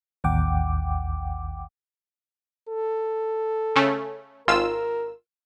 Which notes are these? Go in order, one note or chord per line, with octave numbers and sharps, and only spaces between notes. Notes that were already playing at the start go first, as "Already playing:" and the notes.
A1 D#2 F#5 G5 D6
A4
C#3 A3 C#4
G#1 F4 A#4 E6